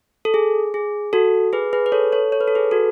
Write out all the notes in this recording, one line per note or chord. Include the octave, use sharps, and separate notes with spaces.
A4
G#4
G#4
F#4 A4
G#4 B4
G#4 B4
B4
A4 C#5
A4 C#5
C#5
B4
A4
G#4 B4
F#4 A4